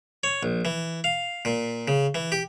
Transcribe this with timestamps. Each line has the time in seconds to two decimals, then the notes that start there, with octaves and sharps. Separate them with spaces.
0.24 C#5
0.43 A#1
0.65 E3
1.04 F5
1.45 A#2
1.88 C#3
2.15 E3
2.32 G4